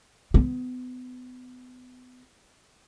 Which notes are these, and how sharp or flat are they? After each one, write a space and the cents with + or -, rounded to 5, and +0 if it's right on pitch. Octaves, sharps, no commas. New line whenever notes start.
B3 +30